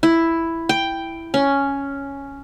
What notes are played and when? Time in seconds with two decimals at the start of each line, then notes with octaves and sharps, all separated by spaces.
0.03 E4
0.69 G5
1.34 C#4